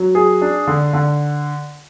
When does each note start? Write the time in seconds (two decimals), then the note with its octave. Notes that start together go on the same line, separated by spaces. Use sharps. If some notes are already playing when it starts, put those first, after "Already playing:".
Already playing: F#3
0.15 G#4
0.41 D4
0.67 D3
0.93 D3